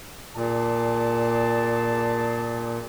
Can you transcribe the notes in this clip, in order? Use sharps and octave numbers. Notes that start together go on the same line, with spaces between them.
A#2 G#4 D5 A5